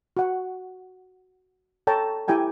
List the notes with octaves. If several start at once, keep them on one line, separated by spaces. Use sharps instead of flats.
F#4 F#5
A4 C#5 G5 A5 A#5
E4 G4 G5 G#5 A#5